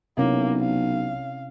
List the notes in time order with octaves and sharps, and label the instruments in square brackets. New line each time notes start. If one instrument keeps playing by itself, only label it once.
[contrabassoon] B1 [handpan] C3 C#4 E4 [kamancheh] A#3
[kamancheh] F5